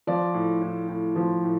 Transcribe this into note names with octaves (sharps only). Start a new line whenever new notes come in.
F3 D5
A2
A2
A2
F3
A2